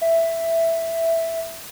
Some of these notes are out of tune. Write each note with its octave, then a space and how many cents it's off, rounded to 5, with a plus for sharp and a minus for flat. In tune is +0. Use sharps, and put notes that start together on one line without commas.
E5 +5